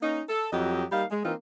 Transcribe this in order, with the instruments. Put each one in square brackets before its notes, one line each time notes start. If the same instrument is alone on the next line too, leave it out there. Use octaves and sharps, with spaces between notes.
[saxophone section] A#3 C#4 D#4
A4
F2 F#3 G4 D#5
G3 A#3 D#4 F5
G#3
E3 A#3 C4 D#4 F4